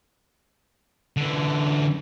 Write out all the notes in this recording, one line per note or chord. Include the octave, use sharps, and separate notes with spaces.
D3 E3